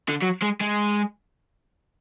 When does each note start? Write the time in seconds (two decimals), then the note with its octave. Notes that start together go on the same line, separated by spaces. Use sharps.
0.08 D3
0.22 F#3
0.42 G#3
0.60 G#3